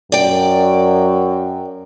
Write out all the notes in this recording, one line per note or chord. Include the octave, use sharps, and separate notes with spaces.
F#2 D5 G5